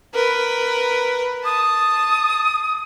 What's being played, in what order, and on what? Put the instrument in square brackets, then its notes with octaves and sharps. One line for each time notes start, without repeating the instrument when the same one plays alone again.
[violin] A#4 B4
[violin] A5 [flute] D#6